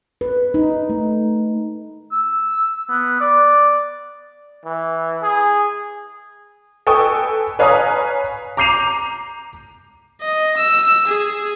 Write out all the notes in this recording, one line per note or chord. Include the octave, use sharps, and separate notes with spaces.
B4
D#4
A3
E6
B3
D5
E3
G#4
A4 B4 G5 G#5 C#6 D#6
B4 C#5 F5 G#5 A#5 D#6
A#5 D6 G6 C7 D#7 F7
D#5
E6
G#4